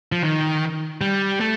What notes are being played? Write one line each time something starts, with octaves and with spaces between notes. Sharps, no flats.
F3
D#3
G3
A3